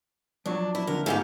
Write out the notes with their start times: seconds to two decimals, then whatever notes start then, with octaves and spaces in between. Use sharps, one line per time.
0.46 F3 F#3 D4 C#5
0.75 E4
0.87 F2 D3 A#4
1.06 G#2 A3 E4 F4 G4 G#4